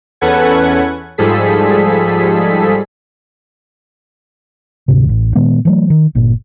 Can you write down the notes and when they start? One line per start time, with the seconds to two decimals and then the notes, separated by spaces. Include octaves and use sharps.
0.21 E2 C#4 A4 B4 F#5 G#6
1.18 G#2 F3 G3 G#4 A4 B6
4.88 D2 G#2 C3
5.09 A1
5.35 A#2 D#3 G#3 B3
5.65 E3 F#3 A3
5.90 D#3
6.15 G1 A#2